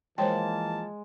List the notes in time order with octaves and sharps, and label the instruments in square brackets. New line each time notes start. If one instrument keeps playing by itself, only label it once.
[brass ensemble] E3 F3 A#3 [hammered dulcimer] G#3 [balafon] C5 C#5 G5 [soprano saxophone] A5